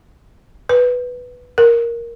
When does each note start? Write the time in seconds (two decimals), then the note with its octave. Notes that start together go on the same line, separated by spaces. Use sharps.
0.69 B4
1.58 A#4